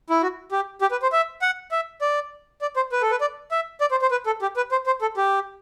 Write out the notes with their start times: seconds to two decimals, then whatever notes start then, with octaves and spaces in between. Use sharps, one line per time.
0.10 E4
0.22 F#4
0.52 G4
0.82 G4
0.91 B4
1.02 C5
1.12 E5
1.42 F#5
1.71 E5
2.01 D5
2.62 D5
2.76 C5
2.92 B4
3.02 A4
3.11 B4
3.21 D5
3.51 E5
3.81 D5
3.91 C5
4.02 C5
4.11 B4
4.26 A4
4.42 G4
4.57 B4
4.72 C5
4.86 C5
5.02 A4
5.17 G4